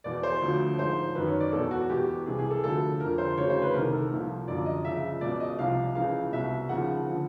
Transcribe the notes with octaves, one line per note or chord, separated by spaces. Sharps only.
E2 B2 D5
C5
D2 D3 F3
G#2 F3 C5
F#2 D#3 B4
C#5
D5
E2 B2 A4
F#4
E2 B2 G4
C2 C3 E3 G#4
G#4
A4
D2 D3 F3 A4
F2 D3 F3 A#4
C5
D2 C#3 E3 C#5
C5
B4
C2 C3 D#3 A#4
A4
C2 A#2 F3
F#2 D3 F3 D5
D#5
C#2 C#3 F3 E5
C#2 B2 D5
D#5
C2 C3 F3 F5
C#2 C#3 E3 F5
C2 B2 E5
D#2 C#3 F3 F#5
D3 F3